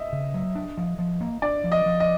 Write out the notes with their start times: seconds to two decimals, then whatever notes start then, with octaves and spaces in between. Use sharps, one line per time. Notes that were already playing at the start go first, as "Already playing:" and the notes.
Already playing: D#5 E5
0.13 C#3
0.34 F#3
0.55 D4
0.77 F3
0.99 F3
1.21 A#3
1.42 D4 D5
1.64 F3
1.72 D#5
1.86 F3
2.00 D#5